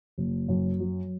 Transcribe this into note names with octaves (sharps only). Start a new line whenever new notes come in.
F#1
F#2
F#3